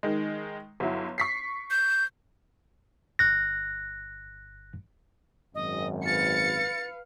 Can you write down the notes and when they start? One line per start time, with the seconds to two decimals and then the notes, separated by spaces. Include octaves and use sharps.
0.03 D#3 G#3
0.80 G1 F#3 E4
1.18 C#6 B6 C7
1.71 G6
3.19 G1 F#6 A#6
5.55 G#1 F#2 D#5
6.06 B4 F5 A6 C#7